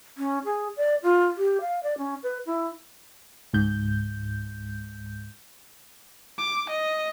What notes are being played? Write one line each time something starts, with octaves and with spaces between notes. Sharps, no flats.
C#4
G#4
D5
F4
G4
F5
D5
C#4
B4
E4
C#2 G#2 G6
D6
D#5